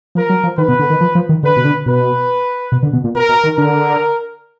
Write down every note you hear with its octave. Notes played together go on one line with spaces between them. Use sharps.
F3 A#4
F#3
F3
D#3 B4
B2
D3
D#3
F3
F3
D#3
D3 B4
B2
D3
B2 B4
B2
D3
B2
A#2
B2 A#4
B2
D#3
D3 A#4